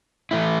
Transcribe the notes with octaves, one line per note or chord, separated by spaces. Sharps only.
E3 A3 E4